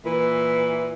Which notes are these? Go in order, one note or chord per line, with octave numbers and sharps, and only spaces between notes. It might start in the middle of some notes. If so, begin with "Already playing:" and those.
A#2 E3